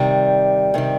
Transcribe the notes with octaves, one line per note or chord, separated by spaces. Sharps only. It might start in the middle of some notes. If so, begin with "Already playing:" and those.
Already playing: C3 D#3 G3
C3 D#3 G3